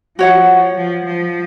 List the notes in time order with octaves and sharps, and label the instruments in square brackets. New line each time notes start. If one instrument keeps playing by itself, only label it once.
[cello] F3 [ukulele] F#4 C#5 F#5
[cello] F3
F3